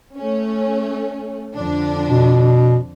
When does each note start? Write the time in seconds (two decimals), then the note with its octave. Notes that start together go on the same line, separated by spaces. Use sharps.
0.16 A3 C#4
1.56 F2 D3 D4
2.09 B2